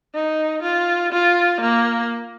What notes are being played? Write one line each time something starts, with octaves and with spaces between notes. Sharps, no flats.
D#4
F4
F4
A#3